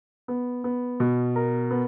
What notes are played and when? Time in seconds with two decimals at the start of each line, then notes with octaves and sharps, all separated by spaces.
0.28 B3
0.64 B3
1.00 B2
1.36 A#4
1.71 B3